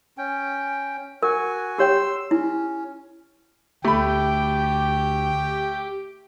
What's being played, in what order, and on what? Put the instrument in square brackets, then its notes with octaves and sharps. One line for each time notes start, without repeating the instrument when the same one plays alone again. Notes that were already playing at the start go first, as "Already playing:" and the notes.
[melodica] C#4 G5
[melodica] F#4 G#5 [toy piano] A#4
[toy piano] G4 C#5 G5 [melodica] C6 E6
[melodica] C#4 [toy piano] E4
[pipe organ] D2 [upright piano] A3 B5 [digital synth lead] G4 [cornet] G5